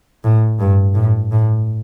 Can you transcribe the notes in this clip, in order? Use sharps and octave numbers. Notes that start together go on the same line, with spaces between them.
A2
G2
A2
A2